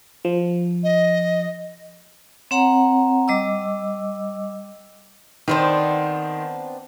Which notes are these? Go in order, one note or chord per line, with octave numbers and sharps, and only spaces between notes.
F3
D#5
C4 C#5 F#5 A#5
G3 D#5 D6 E6
D#3 B3 C4 D4 C5